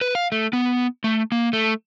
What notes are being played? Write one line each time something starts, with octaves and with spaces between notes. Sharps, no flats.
B4
F5
A3
B3
A3
A#3
A3